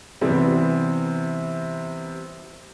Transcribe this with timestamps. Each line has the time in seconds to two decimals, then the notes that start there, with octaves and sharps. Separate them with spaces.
0.21 C3 E3 G3 B3 C4